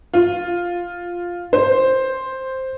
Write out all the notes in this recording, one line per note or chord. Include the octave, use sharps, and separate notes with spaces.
F4
C5